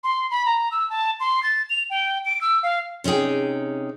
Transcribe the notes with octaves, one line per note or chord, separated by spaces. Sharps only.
C6
B5
A#5
E6
A5
C6
A6
F7
G5
D7
E6
F5
C3 C#4 D#4 G#4 G5